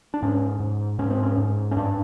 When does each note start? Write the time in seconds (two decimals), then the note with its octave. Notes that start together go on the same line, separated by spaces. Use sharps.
0.14 D4
0.22 G#2 C#4
0.60 G#2
0.99 G#2 C#4
1.10 C4
1.23 C#4
1.38 G#2
1.71 C#4
1.76 G2 D4